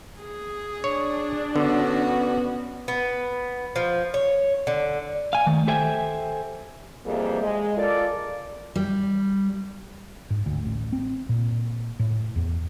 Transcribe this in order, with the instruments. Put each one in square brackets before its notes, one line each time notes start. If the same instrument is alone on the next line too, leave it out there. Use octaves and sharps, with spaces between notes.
[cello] G#4
[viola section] D4 [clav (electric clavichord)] C#5
[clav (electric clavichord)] D3 [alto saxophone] B3 [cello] C#4 F#4
[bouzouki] B3
F3
C#5
D3
[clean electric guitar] F5 G#5
D#3 A3
G4 A4 C5 E5 G5 G#5
[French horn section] F2 C3 E3 G3 A#3 G#4
G#3
F4 A4 A#4 D5
[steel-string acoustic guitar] G3
[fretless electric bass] G#2
D2
A1
C4
A#2
A2
E2